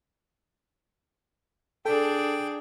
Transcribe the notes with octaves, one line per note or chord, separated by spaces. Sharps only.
D4 G#4 A4 G5